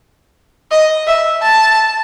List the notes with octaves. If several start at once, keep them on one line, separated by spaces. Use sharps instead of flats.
D#5
E5
A5